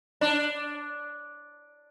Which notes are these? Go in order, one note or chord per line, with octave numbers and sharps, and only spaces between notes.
D4